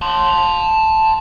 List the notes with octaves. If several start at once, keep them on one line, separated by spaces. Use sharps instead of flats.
A5 C6